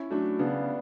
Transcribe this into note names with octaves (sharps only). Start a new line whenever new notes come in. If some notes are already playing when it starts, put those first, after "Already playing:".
Already playing: C#4 E4
F#3 A3 D4
C#3 B3 D4